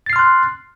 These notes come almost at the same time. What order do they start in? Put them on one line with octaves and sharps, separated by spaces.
A6 C7 F6 C6 F#6